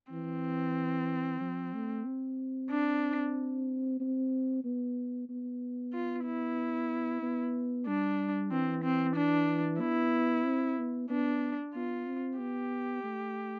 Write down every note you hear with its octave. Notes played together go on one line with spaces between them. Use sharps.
E3 C4
F3
A3
C4
D4
C4
B3
B3
F4
E4
B3
G3 D4
E3 C4
C4
D4
B3 E4
C4
B3
B3 D4
B3 F4
C4
B3 G4
A3